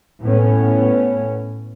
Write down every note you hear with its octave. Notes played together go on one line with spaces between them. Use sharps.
A2 B3 C#4